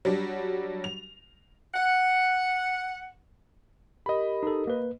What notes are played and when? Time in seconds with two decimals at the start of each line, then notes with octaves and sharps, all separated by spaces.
0.05 F#3 G3 D4
0.84 F7
1.74 F#5
4.06 G4 A#4 D#5 B5
4.43 D#4 A4
4.67 A#3 B4